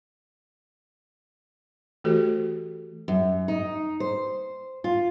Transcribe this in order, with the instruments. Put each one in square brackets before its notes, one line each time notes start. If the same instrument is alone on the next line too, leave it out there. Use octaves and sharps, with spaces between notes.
[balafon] E3 A3 F#4 G4 A4 C5
[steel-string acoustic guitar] F#2
D#4
C5
F4